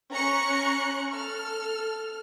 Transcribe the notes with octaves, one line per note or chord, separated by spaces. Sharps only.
C#4 A#5 C#6 F#6 C#7
A4 F6